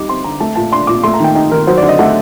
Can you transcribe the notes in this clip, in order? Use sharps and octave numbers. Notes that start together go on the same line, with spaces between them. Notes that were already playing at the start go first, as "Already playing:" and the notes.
Already playing: G3 D#4 D6
C4 C6
D3 A#5
A3 A5
A#2 A5
D4 C6
A#2 D6
A3 C6
A#5
D#3 G5
D#4 G5
D#3 A#4
F#3 C5
D5
D3
D#5
A3 F#5